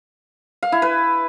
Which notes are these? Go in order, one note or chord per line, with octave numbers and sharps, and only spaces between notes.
F5
E4
B4